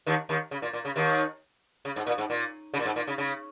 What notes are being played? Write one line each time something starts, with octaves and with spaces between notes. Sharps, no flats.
D#2 D#3
D#2 D#3
C#3
A#2
A#2
C#3
D#2 D#3
C#3
G#2
A#2
G#2
A#2
C#3
A#2
G#2
A#2
C#3
C#3